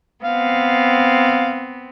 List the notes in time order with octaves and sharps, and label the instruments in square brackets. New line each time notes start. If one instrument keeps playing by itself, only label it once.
[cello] B3 C4 [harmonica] F5